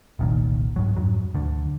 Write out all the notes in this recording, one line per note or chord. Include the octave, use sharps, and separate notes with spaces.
F1 C2 A#2 D#3
G#2 F#3
F2 G#2 F#3
D2 D3